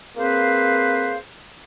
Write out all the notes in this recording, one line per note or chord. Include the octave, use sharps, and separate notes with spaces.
A#3 C4 G#4 B4 C5 F5